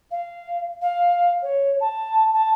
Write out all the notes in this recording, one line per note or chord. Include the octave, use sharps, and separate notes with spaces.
F5
F5
C#5
A5
A5